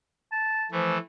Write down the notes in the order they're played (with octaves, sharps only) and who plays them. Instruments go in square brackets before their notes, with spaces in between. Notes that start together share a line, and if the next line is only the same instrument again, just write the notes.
[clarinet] A5
[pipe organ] E3 A3 [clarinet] F3